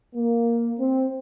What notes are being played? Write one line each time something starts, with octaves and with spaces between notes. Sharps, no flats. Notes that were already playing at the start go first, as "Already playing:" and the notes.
A#3
C4